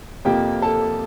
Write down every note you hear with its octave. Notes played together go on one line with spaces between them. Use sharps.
F2 C3 F3 A#3 G4 G5
A4 A5